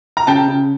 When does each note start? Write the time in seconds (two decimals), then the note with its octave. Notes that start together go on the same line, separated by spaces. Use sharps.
0.17 A#5
0.27 C#3 G5 A5
0.48 C#3